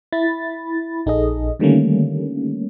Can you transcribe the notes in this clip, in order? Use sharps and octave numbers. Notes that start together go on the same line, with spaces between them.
E4 B5 A6
A#1 D#4 G#4 A4 D#5
D3 D#3 G3 A3 A#3 C#4